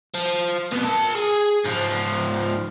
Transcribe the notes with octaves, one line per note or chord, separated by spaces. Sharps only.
F3
C3 B3
A#4 A5
G#4
G#2 F3